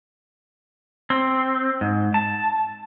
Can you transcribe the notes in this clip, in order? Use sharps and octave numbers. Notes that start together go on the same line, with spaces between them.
C4
G#2
A5